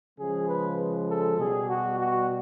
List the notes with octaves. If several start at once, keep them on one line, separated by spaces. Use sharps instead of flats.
C#3 F3 G#3 G#4
B4
A4
B2 G3 G#4
F#4
F#4